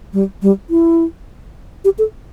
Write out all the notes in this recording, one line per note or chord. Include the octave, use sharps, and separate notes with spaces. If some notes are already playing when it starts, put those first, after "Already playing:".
G3
G3
E4
G4
A4